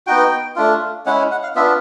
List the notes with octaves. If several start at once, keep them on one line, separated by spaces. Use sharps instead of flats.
B3 D#4 F#4 G5
A3 D4 F4
G#3 C#4 E4 F#5
F#5
F5
B3 D4 F4 E5